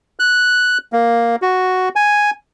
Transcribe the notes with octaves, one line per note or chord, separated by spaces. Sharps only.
F#6
A#3
F#4
G#5